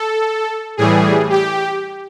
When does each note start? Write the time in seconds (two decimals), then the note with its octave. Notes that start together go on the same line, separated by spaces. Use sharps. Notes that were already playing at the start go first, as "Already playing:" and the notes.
Already playing: A4
0.77 A2 E3 G3 G#4
1.30 G4